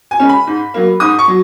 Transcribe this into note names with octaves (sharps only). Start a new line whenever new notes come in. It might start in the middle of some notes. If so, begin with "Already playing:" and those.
G#5
C#3 G#3 C#4
B5
G#2
F#3 A#3
G#2 D#6
C#6
F#3